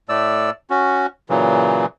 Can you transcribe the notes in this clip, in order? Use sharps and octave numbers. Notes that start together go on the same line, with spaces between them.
A2 A3 D5 E6
C#4 F#4
A#2 C#3 E3 F#3